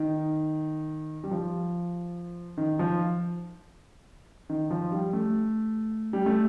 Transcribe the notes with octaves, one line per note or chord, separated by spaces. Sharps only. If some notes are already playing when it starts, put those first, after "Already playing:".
Already playing: D#3
G3
F3
D#3
F3
D#3
F3
G3
A3
G3
A3